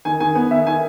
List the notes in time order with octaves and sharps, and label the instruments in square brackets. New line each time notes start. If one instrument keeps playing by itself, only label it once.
[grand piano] D#3 [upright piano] G#5
[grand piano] D#3 [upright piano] G#5
[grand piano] B3 [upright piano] G#5
[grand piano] D#3 [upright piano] E5
[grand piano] D#3 [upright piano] G#5